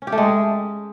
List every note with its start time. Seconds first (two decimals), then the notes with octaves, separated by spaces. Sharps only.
0.02 C#4
0.07 G4
0.12 A3
0.18 G#3